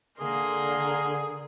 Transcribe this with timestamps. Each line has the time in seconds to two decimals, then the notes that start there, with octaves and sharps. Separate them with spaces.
0.20 D3 A#3 G#4 A#4 C6